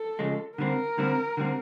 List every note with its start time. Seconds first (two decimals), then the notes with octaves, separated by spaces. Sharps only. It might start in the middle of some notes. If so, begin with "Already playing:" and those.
Already playing: A4
0.19 C#3 F3 G#3
0.58 D3 G3 C4 A#4
0.98 D3 G3 C4
1.37 D3 G3 C4